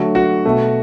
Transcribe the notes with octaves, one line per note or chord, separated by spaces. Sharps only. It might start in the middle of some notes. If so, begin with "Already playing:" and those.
Already playing: D3 F#3 A3 F#4
F#4
B2 A3